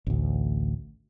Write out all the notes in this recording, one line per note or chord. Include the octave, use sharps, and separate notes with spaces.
A1 D2